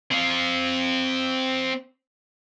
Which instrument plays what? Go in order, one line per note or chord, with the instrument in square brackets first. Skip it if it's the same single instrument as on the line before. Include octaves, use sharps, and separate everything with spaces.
[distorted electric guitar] C4 F5